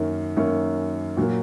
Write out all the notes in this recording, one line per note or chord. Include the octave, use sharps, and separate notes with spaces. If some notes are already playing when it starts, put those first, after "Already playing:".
Already playing: F#2 D#3 A#3 C#4
F#2 D#3 A#3 C#4
A#2 F#3 A#3